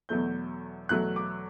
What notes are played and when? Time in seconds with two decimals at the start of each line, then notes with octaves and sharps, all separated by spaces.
0.09 E2 B2 F#3 A3 G6
0.89 E2 B2 F#3 A3 F#6
1.16 D6